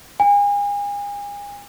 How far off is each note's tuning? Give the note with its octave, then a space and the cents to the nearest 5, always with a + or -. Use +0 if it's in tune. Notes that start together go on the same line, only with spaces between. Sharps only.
G#5 -35